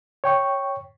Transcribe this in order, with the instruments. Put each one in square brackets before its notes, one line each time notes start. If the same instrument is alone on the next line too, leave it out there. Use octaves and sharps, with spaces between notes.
[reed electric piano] C#5 G5 C#6